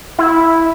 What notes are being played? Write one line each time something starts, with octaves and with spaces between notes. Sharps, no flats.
E4